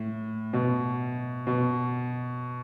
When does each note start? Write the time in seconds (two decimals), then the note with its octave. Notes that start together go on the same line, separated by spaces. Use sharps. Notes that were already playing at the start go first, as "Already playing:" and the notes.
Already playing: A2
0.53 B2
1.47 B2